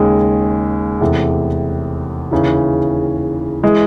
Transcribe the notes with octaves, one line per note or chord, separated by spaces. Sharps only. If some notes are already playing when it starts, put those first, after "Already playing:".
Already playing: D#2 C#3 G#3
E2 C3 E3 A3
D#2 C#3 E3
E3 G#3